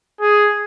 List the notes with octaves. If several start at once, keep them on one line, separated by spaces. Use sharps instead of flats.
G#4